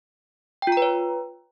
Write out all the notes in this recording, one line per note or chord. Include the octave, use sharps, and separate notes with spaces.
F4 B4 C#5 G5 A#5